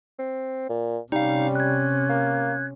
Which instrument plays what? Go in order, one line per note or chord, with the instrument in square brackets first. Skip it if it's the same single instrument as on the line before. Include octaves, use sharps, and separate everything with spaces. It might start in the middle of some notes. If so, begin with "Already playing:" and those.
[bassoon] C4
A#2
[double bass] C3 C#4 [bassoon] G3 [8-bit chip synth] D#4 F5
[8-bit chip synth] F#6 G#6
[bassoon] A#3